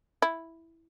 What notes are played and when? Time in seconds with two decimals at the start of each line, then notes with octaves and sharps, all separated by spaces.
0.22 E4